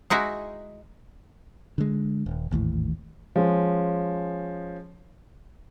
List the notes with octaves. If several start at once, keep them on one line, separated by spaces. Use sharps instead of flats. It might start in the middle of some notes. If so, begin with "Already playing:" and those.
G#3 D#4 E4 F#4
D3 G#3
D#1
G#1 D#2 A2 E3
F3 G#3 C#4